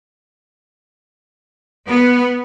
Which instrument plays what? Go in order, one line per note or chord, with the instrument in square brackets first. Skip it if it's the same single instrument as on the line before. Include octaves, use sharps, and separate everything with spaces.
[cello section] B3